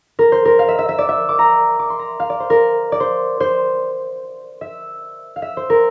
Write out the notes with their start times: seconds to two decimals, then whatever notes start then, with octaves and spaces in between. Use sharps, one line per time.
0.19 A#4
0.32 C5
0.45 A#4
0.59 F5
0.68 E5
0.79 E5
0.89 E5
0.98 D5
1.09 E5
1.29 D6
1.39 A#5
1.79 D6
1.90 C6
1.99 A#5
2.20 F5
2.30 D5
2.40 C5
2.50 A#4
2.92 D5
3.00 C5
3.40 C5
4.61 E5
5.36 F5
5.42 E5
5.57 C5
5.70 A#4